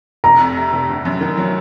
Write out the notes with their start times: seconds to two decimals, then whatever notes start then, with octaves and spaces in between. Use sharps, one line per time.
0.24 F1 A#5
0.40 F2
0.57 C3
0.73 F1
0.89 G1
1.05 F#2
1.21 D#3
1.37 F#3